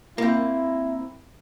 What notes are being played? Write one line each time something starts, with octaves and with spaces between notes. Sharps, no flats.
A#3 C4 E4